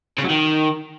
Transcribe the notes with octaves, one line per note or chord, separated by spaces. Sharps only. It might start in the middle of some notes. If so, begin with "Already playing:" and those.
C#3
F#3
D#3